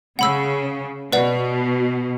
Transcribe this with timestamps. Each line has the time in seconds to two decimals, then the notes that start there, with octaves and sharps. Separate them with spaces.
0.19 C#3 F#5 B5 E6
1.12 B2 B4 D5 F#5